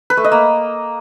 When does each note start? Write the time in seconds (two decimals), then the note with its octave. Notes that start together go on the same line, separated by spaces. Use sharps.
0.10 B4
0.17 A3
0.24 D#5
0.32 A#3